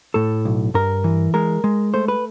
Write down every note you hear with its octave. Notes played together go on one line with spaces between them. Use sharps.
A2 A4
B1
G2 A#4
E3
G#3 A#4
G#3
A3 C5
B4